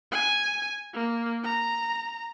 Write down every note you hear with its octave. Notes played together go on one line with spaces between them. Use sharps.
G#5
A#3
A#5